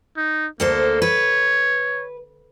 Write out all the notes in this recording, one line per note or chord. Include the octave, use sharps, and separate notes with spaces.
D#4
D2 A#3 A4 C5
B4 C#5